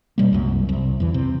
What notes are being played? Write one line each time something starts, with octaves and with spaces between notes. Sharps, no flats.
F1 B2 G3 A#3
C2 F#2
C2
E2 E3
C3